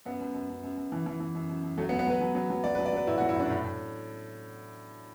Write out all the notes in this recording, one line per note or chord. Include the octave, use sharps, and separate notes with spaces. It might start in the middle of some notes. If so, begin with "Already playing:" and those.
F#2 B3
F#2
F#2
F#2
F#2
F#2
E3
E3
E3
F#2
F#2
F#2
F#3 A3
B3
F#3
B3
F#3 B4
F#3
F#3
F#3
F#3 D5
B4
F#3
D5
F#3 B4
A2 E4
F#4
F#3
E4
A2 D4
A2
A2